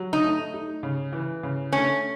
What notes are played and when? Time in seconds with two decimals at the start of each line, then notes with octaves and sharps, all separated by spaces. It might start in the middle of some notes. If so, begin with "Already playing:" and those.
Already playing: F#3
0.13 D#4
0.24 A3
0.54 D#4
0.83 C#3
1.13 E3
1.43 C#3
1.73 A3 C#4